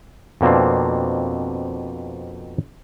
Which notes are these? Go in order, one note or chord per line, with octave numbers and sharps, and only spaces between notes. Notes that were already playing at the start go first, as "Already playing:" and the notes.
F2 B2 A#3 C4 D4